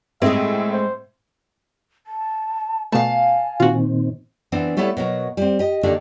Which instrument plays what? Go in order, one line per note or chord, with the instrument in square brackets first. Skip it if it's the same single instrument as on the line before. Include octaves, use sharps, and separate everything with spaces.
[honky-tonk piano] A2 C4 [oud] G#3 G#4 [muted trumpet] E5
[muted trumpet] C5
[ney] A5
[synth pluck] B2 A3 [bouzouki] F5 A5 [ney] G#5
[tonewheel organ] A#2 D#3 C4 [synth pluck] F4 F#4
[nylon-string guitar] E3 B3 C4 D4
G3 A3 B3 E4 A4 C#5
B2 F#3 A#4
G3 C4
G4 D#5
D3 D#3 A#3 D4 G4 A4